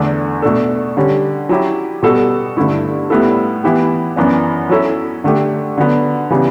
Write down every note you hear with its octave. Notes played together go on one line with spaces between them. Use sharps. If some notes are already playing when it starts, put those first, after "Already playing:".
Already playing: E2 D3 A3 D4
B2 A3 D4 A4
D3 G3 C#4
F#3 C#4 E4 G4
B2 G3 B3 F#4 A4
G2 D3 A3 E4
A2 G3 B3 E4 A4
E3 B3 E4 G4
F#2 E3 B3 D4
F#3 C#4 E4 A4
D3 A3 D4 G4
D3 F#3 B3
C#3 E3 G3 B3